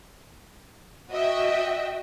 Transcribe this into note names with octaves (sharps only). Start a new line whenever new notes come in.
F#4 D#5 E5 G5